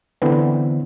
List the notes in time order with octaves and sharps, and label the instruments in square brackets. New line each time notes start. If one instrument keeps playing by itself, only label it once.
[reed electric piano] D3 E3 B3 C4